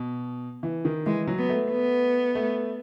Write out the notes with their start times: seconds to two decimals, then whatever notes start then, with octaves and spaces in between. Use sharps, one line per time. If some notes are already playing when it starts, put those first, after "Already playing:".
Already playing: B2
0.63 E3
0.85 D#3
1.06 E3 G#3
1.27 F#3
1.38 B3
1.49 A3
1.71 B3
2.35 A3